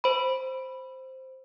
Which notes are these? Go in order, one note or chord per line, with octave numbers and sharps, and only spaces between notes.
C5 B5